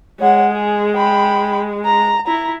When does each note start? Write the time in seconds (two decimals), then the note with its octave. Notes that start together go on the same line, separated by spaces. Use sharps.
0.20 G#3 C#5 F#5
0.50 G#4
0.95 G5 B5
1.85 A#5
2.27 E4 A#5